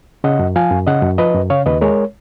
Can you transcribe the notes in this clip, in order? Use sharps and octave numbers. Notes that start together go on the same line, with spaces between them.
C#3 D#5 F#5
F#2
F3 F5 G#5
F#2
C#3 D#5 F#5
F#2
F3 B4 D#5
F#2
C#3 C#5 F5
D#2 B4 D#5
G#3 A#4 C#5